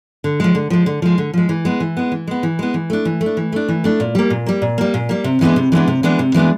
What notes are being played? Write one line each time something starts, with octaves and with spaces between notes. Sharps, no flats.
D3
F3 G#3
D3
F3 G#3
D3
F3 G#3
D3
F3 G#3
E3
G#3 B3
E3
G#3 B3
E3
G#3 B3
E3
G#3 B3
E3
A3 D4
E3
A3
D4
E3
A3 D4
E3
A3 D4
A#2
G3 A#3
A#2
G3 A#3
A#2
G3 A#3
A#2
G3 A#3
C3
E3 G#3 B3 D4
C3
E3 G#3 B3 D4
C3
E3 G#3 B3 D4
C3
E3 G#3 B3 D4